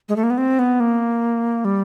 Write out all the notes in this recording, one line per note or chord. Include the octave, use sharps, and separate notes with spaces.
G#3
A3
A#3
B3
C4
B3
A#3
G3